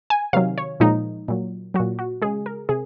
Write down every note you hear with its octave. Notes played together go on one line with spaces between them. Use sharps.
G#5
C3 D#3 F#3 F5
C#5
A#2 F3 G#3 D#4
A#2 F#3
F#3 F#4
A#2
F#4
C#3 G#3 G#4
A#4
C3 G#4